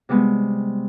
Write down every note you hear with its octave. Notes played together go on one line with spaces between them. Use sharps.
C3 G3 G#3 B3